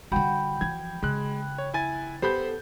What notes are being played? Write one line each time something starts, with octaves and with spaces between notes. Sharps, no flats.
D3 G3 F#4 G5 B5
E3 F3 G#6
C#3 G#3 F#6
C#5
E4 G#5 A6
B3 G4 A4 C5 B5 G6